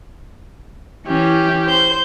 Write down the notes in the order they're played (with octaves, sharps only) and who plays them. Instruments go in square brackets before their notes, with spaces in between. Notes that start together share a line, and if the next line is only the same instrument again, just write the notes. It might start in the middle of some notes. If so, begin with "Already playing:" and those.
[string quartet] E3 [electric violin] C#4 G4
[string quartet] C5 C6 G6